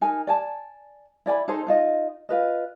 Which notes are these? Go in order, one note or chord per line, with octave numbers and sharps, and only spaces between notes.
D#4 A#4 G#5
D5 G#5 A5
E4 D5 G#5 B5
D#4 G#4 A4 C5
D#4 F4 D#5
F4 B4 D#5